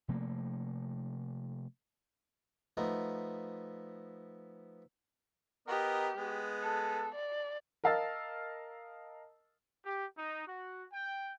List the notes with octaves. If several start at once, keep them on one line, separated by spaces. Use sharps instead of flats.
C3 F3 A3 A#3
F3 A3 B3 D#4 D#5
B3 G4 A#4 D#5
G#3 B3
A4
D5
A#4 D#5 F5 A5 E6 A6
G4
D#4
F#4
G5